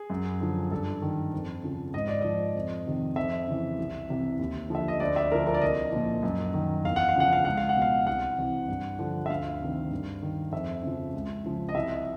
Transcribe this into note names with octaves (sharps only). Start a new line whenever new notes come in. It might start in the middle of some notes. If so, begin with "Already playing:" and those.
Already playing: G#4
F#2
D3 F3
G2 A4
D#3
F2
C#3 F3
G#2 D#5
D5
F3 D#5
F2
C3 D#3
F2 E5
C#3 E3
C2
C3 E3
D#2
D3 F3 E5
D#5
D2 D5
E5
D3 F3 A#4
A#4
D5
C2 D#5
A#2 F3
F#2
D#3
E2 F5
F#5
F5
C#3 F3 F#5
F5
C#2 F#5
F5
F#5
B2
F5
C2 F#5
C3 E3
G2
D3 F3
E5
D2 F5
C3 D#3
G2
D#3
F2 E5
C#3 F3
C#2
C#3 F3
D#5
C2 E5